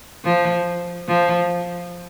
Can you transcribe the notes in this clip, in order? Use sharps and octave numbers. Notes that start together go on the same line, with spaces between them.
F3
F3